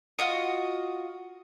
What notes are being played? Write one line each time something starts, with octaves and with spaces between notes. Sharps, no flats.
F4 F#4 D#5